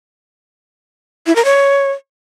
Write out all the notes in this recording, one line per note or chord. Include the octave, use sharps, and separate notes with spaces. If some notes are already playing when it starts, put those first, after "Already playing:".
E4
A#4
C#5